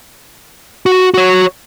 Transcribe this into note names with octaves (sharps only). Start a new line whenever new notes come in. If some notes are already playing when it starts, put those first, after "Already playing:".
F#4
F#4 C#5